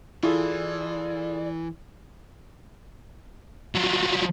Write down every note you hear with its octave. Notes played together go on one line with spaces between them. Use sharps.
E3 E4 F4 G#4 A4 D5
F3 F#3